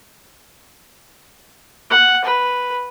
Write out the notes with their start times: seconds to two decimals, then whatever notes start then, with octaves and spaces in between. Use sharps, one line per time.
1.90 F#5
2.24 B4